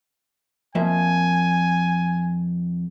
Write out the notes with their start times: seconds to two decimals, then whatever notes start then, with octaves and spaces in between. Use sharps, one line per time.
0.75 F2 A#3 E5 G#5